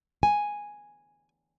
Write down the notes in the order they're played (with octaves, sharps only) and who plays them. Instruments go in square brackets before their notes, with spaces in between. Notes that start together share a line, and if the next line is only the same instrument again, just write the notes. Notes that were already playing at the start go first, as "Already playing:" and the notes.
[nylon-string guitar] G#5